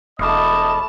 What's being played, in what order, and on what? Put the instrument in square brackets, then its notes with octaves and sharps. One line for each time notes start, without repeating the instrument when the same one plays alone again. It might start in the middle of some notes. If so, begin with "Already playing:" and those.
[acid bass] E1 [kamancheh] A3 A5 [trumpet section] E4 D#5 [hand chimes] B5 D6 F6